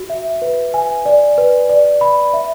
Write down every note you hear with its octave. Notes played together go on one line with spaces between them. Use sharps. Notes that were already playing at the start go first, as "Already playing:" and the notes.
Already playing: F#4
E5
B4
G#5
D5
B4
D5
B5
E5